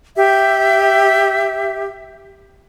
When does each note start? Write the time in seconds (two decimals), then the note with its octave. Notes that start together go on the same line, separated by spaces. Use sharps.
0.15 G4 E5